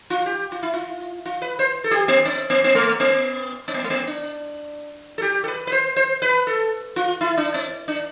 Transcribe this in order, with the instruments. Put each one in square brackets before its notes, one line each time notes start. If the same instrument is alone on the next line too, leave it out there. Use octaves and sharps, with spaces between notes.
[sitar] F4
G4
F4
E4
F4
F4
B4
C5
A4
G4
B3
C4
B3
B3
A3
B3
C4
B3
A3
B3
D4
A4
G4
A4
B4
B4
C5
C5
B4
A4
F4
E4
D4
C4
D4